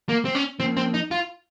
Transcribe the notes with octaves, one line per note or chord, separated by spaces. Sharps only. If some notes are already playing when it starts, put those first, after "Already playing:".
A#3
C4
C#4
F3 A#3 C4 C#4
C4
D#4
F4